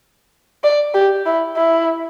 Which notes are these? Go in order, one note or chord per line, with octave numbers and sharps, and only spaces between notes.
D5
G4
E4
E4